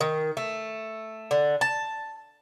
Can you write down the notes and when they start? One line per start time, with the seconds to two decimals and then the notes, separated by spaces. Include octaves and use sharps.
0.01 D#3
0.37 A3
1.31 D3
1.61 A5